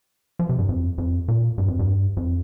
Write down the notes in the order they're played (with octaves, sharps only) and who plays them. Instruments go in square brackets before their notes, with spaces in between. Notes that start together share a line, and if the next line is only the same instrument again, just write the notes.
[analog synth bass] F3
C3
G2
F2
F2
A#2
G2
F2
G2
F2